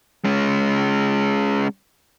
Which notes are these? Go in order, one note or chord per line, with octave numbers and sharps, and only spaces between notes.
G#3 C#4